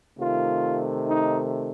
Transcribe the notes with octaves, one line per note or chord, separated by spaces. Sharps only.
C3 D#3 A3 F4
D#4